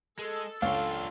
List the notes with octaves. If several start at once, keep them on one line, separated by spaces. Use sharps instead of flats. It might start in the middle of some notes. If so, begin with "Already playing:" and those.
G#3 A4
C#2 D4 F4 C#5 F5